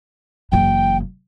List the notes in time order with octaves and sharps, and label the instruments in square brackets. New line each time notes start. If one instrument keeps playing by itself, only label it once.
[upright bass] F#1 E3 [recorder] G5